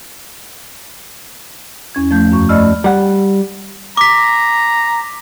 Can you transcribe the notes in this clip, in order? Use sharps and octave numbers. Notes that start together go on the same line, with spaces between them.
E2 C#4 G#6
F3 A3 G6
F#2 C#6
A3 D5 D#5 B5 E6 F6
G3 F#5
A#5 D6 B6